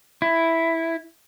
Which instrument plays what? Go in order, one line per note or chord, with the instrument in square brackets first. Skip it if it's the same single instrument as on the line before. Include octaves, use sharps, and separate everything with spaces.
[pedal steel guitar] E4